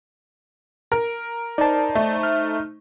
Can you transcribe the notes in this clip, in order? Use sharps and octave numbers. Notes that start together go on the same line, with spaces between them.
A#4
D#4 C5 D5 A5
A3
F6